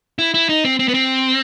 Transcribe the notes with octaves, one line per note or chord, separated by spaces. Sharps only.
E4
E4
D#4
C4
C4
B3
C4